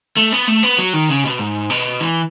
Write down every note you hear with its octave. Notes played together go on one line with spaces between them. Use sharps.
A3
B3
A3
B3
F#3
D#3
C#3
B2
G#2
B2
E3